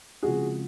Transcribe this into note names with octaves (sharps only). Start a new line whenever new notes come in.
C#3 F3 G#3 C4 F4 F#4 G#4